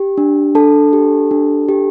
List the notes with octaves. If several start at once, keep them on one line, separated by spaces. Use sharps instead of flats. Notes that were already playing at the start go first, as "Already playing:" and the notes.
Already playing: G4
D4
D4 A4 A5
G4
D4
G4